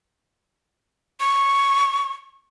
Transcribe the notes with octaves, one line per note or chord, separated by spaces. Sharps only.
C#6